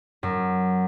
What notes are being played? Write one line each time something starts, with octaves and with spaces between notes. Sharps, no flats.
F#2